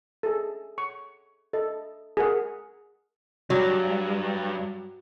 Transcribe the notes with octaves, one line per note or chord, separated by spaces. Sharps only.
G#4 A4
C#6
A4 D#5
G#4 A#4 F#5
G2 F#3